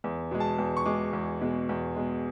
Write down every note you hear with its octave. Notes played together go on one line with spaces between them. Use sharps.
E2
B2 G#3
A5
E2
C#6
B2 G#3 D6
E2
B2 G#3
E2
B2 G#3